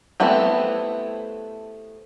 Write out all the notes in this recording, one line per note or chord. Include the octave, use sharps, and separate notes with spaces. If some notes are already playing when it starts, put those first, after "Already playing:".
A3 B3 C4 E4 G4